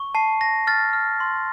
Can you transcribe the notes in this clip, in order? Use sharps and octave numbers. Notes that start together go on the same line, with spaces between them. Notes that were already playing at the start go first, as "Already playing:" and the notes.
Already playing: C#6
A5 C7
A5 A#6
F6 A6
F6
C6